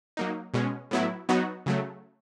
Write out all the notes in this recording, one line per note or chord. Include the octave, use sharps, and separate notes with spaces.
F#3 A#3 D#4
B2 G#3 C#4
A2 F#3 B3 E4
F#3 B3 D#4 F#4
C#3 F#3 A3